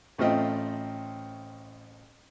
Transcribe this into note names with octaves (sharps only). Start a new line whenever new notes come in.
A1 A3 C4 F4 D#5 G5